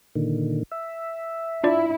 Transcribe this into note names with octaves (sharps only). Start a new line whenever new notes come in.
A#2 D3 D#3
E5
D4 E4 F4 D5